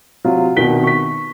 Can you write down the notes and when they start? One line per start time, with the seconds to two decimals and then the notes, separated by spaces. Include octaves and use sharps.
0.24 C3 F#3 F4
0.57 C2 B2 D#3 B6 G7
0.83 C#6 B6